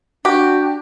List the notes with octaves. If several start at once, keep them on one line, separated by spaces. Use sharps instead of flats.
D4 F#4 G4